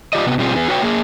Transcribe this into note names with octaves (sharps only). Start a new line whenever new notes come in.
F4 G4 D5 D#5
C3 B3
B2 G3 C4 F4 G#4
E2 B3 G#4
F#4 B4 C#5 G5
A#3 G#4